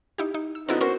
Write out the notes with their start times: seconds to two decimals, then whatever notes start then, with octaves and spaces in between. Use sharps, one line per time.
0.18 D#4 E4 G4
0.34 D#4
0.55 E6
0.69 D3 B3 C4 D#4 E4 F#4
0.81 B3 C#4 F#4 A#4 C5 C#6